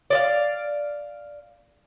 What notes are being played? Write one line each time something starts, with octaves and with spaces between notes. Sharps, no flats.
D5 D#5 F5